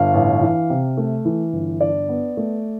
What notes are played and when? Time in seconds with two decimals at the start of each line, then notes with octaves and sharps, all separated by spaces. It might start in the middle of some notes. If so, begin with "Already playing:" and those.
Already playing: G1 F5
0.14 A1
0.42 E3
0.70 C3
0.97 A3
1.25 E3
1.53 G1
1.81 D4 D5
2.09 B3
2.37 A3